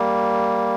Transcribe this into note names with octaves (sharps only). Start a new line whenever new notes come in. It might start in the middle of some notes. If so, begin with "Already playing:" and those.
Already playing: G3 A#3